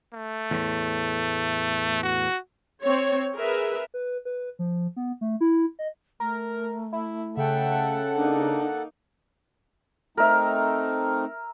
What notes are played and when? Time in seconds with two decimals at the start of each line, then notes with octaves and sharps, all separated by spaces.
0.13 A3
0.51 E2 A2
2.03 F#4
2.83 C4 C#5
3.36 G#4 A#4 B4 E5
3.94 B4
4.25 B4
4.59 F3
4.96 B3
5.21 A3
5.41 E4
5.79 D#5
6.20 A3 A#4
6.93 E4
7.37 C#3 A4 E5 F#5 G5
8.16 A#3 D4 D#4
10.17 A3 C4 D#4 A#4 E5